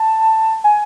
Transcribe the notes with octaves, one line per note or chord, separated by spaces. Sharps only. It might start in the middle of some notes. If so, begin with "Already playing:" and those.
Already playing: A5
G#5